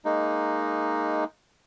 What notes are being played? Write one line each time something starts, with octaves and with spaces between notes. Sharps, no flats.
G#3 A#3 D#4